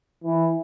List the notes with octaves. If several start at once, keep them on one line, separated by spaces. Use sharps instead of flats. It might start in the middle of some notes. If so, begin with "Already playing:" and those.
E3